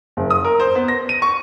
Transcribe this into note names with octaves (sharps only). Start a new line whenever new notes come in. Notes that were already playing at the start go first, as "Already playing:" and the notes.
F#1
D#6
A#4
C5
B3
A#6
D#7
C#6